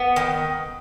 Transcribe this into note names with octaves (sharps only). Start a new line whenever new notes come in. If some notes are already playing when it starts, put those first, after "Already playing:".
Already playing: B3
D#3